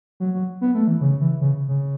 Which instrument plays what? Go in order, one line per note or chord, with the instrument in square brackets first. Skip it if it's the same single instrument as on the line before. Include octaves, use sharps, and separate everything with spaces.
[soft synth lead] F#3
F#3
B3
A3
E3
C#3
E3
C#3
C#3